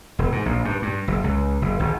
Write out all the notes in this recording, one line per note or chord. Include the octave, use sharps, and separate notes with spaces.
E1
G#2
A#1
G2
G2
F#1
C#2
F#1
G#1